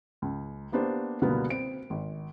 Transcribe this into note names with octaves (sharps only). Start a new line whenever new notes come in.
C#2
A#3 B3 D4 G4 C5
C#2 B2 D3 G3 A#3 B3
C4 D7
G#1